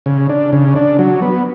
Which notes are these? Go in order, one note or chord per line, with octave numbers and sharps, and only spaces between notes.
C#3
D4
C#3
D4
F#3
B3